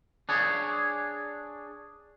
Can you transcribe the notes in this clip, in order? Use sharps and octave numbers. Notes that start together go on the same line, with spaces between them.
D4 G#4 C#5